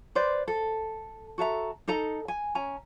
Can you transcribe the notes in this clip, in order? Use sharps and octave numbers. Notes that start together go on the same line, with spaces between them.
B4 C5 D5
A4
F#4 A4 E5 A#5
D#4 A4 D#5 A#5
G#5
C#4 G#5 A#5